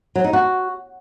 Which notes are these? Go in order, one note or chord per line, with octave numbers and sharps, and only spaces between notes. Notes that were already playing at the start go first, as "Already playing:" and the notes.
F#3
D#4
F#4